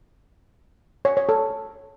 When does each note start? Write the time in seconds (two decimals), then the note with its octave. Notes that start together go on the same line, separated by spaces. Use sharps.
1.05 C#5
1.17 C#5
1.29 A4